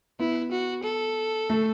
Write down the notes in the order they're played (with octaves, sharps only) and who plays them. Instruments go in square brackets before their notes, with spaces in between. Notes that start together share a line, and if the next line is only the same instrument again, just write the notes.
[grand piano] B3 [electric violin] E4
[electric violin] F#4
A4
[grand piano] A3